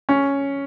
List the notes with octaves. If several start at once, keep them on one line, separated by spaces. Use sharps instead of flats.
C#4